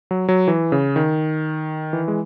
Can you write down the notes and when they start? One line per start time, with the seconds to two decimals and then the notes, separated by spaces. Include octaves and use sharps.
0.11 F#3
0.28 F#3
0.48 E3
0.72 C#3
0.96 D#3
1.93 E3
2.08 G#3